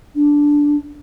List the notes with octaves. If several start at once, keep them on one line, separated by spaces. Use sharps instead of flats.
D4